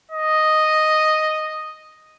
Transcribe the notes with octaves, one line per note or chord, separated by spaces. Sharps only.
D#5